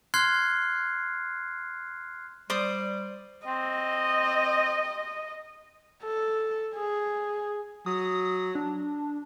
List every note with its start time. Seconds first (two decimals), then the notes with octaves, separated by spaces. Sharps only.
0.14 C6 F6 F#6 G#6 C7
2.50 G3 C5 D5 D#6
3.47 C4 D#5
6.04 A4
6.75 G#4
7.86 F#3 D#6
8.55 D4